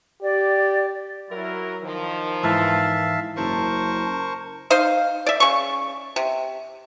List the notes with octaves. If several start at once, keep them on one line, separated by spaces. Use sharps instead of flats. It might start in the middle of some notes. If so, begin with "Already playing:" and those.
G4 D5
F#3 E4 A#4
D#3 F3
G#2 E3 E5 F5 A5
F#1 A#4 C5 A5 C#6
D#4 C5 F5
D5 E5
C#3 C#6
C3